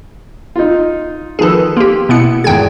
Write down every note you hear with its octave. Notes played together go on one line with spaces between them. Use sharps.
D#4 F4
D#3 F3 G#4 A4 B4
A#3 G4 C6
B2 B3 E4 C#7
G#1 E2 G#3 G5 G#6